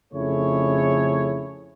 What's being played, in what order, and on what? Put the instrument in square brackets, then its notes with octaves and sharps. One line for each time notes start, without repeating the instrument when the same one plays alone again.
[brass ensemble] F2 C#3 A3 E4 G#4 C#5